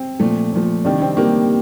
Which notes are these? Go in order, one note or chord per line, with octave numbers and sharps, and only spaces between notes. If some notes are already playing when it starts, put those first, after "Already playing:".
Already playing: C4
A#2 F3 A3
A#2 F3 A3
C3 D#3 G3 D4
C4
C3 D#3 G3 A#3